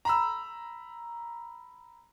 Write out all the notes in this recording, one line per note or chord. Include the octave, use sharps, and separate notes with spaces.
A#5 B5 E6